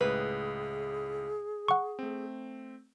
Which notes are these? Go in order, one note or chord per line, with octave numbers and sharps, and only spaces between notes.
C#2 A2 G#4 B4
F#5 C#6
A3 C4